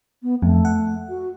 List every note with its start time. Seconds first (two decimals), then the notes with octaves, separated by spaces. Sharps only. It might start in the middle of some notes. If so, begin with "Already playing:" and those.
0.23 B3
0.42 F2 A3
0.65 F#5
1.09 F#4